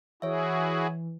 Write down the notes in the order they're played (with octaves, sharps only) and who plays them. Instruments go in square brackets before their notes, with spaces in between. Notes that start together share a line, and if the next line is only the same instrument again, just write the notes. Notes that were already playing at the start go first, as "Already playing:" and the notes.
[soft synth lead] E3 [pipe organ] E4 F#4 G#4 [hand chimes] C#5 E5